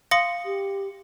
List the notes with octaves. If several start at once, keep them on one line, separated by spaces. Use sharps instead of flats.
F5 C6 D#6 A#6 C#7
G4